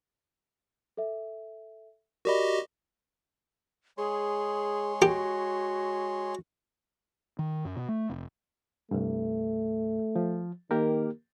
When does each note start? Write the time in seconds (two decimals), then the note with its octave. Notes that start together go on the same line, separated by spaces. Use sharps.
0.97 A4 E5
2.25 F#4 G4 A#4 D5 D#5 B5
3.98 G#3 G#4 C#5 C6
5.02 F#4 G4
7.39 D#3
7.65 F#2
7.76 B2
7.89 A3
8.09 F1
8.91 C2 G2 A3
10.16 F3
10.71 D#3 A#3 G4 A#4